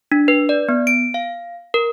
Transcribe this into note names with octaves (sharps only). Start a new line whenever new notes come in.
D4
B4
D5
B3
D7
F5
A#4